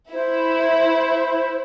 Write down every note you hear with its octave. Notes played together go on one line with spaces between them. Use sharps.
E4 C5